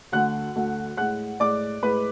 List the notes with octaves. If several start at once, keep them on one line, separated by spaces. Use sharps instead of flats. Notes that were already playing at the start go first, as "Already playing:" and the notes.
D2 D3 A3 F#5 F#6
D2 D3 A3
A2 G#3 F#5 F#6
A2 G#3 D5 D6
A2 G#3 B4 B5